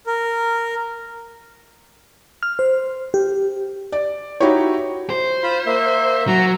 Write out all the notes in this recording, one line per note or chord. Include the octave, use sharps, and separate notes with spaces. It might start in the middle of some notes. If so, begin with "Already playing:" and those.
A#4
F6
C5
G4
D5
D#4 E4 F#4 G4 C#5
C5
F4 B5
A#3 E5
F#3 A#5